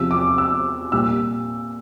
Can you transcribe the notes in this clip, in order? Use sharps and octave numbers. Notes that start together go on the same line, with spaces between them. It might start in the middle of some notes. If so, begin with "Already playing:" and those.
Already playing: E2 C3 F3 E6
D6
E6
A#2 G3 E6